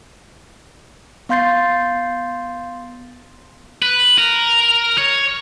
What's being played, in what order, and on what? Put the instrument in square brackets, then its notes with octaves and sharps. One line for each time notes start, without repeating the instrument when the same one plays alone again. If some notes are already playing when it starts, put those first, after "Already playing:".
[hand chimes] B3 F5 C6 G6 A6 C7
[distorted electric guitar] B4
A#4
C#5